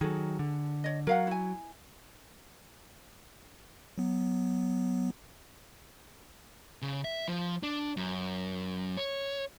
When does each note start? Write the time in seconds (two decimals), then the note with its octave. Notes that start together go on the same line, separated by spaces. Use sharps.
0.01 D#3 F#3 G#4 A4
0.39 D3
0.84 C#5 D#5
1.07 F#3 A#4 F5 F#5
1.27 E4 G#5
3.98 F#3 B3
6.82 C#3
7.04 E5
7.28 F3
7.63 D4
7.97 F#2
8.97 C#5